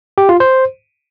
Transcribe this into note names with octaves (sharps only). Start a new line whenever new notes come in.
G4
F4
C5